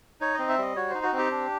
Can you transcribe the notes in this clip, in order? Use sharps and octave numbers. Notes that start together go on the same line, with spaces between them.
D#4 C#5
C4 D#5
E5
G3 D#5
F#4 C#5
D#4 C5
F#4
C4 G4
D4